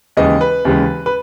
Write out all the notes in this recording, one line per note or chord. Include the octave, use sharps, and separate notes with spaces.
D#2 C#3 E3 G#3 D#5
B4
D#2 C#3 E3 G#3
B4